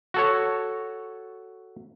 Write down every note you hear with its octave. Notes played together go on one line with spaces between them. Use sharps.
F#4 A4 C#5